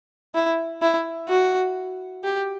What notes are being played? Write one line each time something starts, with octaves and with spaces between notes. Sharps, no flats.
E4
E4
F#4
G4